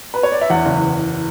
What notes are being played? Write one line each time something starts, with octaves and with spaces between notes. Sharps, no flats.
B4
C#5
D5
E5
E2 F#5
F#1